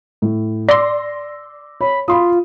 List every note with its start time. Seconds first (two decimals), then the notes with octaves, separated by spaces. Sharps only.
0.22 A2
0.69 D5 C6 D6 E6 A#6
1.81 C#5 B5
2.08 F4 B5 C6 D#6